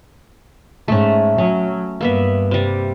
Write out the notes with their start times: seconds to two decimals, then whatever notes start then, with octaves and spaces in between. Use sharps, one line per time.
0.88 G#2 A3 C#4
1.38 F#3 C#4
2.01 G2 A#3 B3 E5
2.51 C3 G3